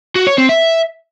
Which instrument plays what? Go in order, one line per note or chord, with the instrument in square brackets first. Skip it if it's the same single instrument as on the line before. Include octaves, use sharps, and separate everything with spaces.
[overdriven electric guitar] F#4
C#5
C4
E5